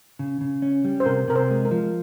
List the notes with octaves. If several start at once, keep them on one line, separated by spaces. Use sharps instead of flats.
C#3
C#3
C#4
G3
C5
C3 A#4
C3 A#4
C5
G#3
A#4
F3